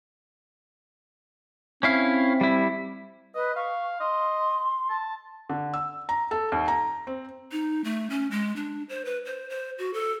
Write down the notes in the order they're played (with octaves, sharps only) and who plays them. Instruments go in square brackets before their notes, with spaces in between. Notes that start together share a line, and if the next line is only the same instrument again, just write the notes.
[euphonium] C4 [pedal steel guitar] C#4 E4 F5
[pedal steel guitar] G3 E4
[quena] B4 [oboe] D#5
[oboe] F5 [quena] C#6
[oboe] D#5 [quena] C6
[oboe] A5
[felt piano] D3
E6
A#5
A4
D#2
A#5
C4
[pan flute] D#4
A3
C#4
G#3
D4
C5
B4
C5
C5
F#4
A4